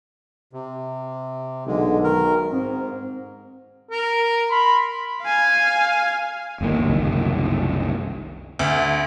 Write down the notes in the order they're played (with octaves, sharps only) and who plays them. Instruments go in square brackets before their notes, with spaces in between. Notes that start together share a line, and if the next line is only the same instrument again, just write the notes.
[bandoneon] C3
[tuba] B1 [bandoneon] D3 G#3
[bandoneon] D#3 A#4
[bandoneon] G#2 [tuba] C4
[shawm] A#4
[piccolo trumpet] B5 [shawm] C6
[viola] F5 G#5
[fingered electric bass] G1 D#2 C#3 A#3
F#1 C2 D#3
[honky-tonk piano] D2